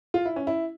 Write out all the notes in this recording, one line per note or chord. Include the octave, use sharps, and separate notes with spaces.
F4
E4
C#4
E4